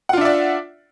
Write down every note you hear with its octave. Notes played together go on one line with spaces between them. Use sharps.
D4 F4 D5 E5 F#5